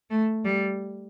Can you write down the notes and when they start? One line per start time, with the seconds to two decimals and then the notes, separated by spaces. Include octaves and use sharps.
0.10 A3
0.45 G3